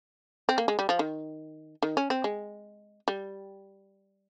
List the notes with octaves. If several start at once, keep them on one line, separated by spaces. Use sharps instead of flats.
C4
A#3
G#3
G3
F3
D#3
D#3
C#4
C4
G#3
G3